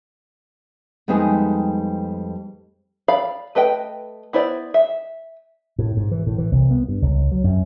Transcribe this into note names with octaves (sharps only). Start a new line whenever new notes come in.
F2 G3 G#3 B3 D#4 G#4
D5 F5 B5
A3 B4 D#5 G5
B3 E4 C5 D5
E5
A2
G#2
E3
A2
E3
C2
B3
G2
C#2
F#3
F#2